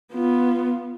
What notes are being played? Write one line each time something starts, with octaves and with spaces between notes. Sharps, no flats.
B3 F4